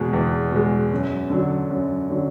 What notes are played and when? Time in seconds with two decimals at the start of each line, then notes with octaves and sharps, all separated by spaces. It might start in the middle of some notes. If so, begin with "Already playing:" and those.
Already playing: E2 B2 G#3
0.13 E2
0.51 B2 G#3
0.92 F#2
1.30 D3 F#3
1.70 F#2
2.09 D3 F#3